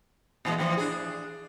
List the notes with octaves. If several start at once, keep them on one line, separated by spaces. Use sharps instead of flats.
A#2 E3 G#3
A2 E3 F3
D4 G#4